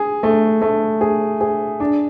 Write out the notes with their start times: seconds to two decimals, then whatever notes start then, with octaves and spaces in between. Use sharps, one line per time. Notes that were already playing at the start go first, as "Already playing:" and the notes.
Already playing: G#4
0.23 A3
0.62 A3
1.01 G#4
1.41 G#4
1.80 D4